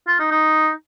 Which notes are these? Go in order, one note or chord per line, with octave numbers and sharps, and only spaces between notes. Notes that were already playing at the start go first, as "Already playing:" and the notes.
F4
D#4
D#4